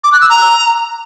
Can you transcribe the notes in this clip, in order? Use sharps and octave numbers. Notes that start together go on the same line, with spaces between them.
D6
F#6
E6
A#5